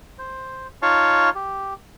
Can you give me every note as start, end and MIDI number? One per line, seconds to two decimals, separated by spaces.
0.19 0.67 72
0.82 1.29 63
0.82 1.29 65
0.82 1.29 73
0.82 1.29 77
0.82 1.29 81
0.82 1.29 85
1.35 1.74 67